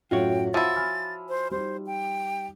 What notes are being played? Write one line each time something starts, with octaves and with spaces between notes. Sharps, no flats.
F#2 A2 F#3 F4 F#4 C#5 G5
F3 E4 F#5 E6 A6 D#7
G#5 B5 F6
C5
G3 D#4 C5
G5